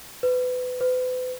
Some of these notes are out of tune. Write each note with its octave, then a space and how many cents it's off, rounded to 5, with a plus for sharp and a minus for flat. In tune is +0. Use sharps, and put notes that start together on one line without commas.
B4 +25
B4 +40